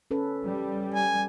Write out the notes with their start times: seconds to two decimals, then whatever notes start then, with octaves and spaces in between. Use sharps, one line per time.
0.11 C#4 A4 B4
0.44 G3
0.94 G#5